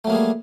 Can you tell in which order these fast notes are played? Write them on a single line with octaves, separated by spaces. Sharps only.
A3 F#3 A#3 G#4 G3